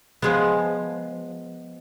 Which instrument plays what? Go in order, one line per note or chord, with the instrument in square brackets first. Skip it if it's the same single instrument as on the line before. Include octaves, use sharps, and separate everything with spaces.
[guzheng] F3 G#3 B3